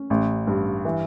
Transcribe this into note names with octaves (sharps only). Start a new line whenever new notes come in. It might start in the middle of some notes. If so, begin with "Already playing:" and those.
Already playing: C#4
A1
G2
E3